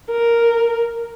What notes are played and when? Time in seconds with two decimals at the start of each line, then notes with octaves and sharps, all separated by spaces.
0.11 A#4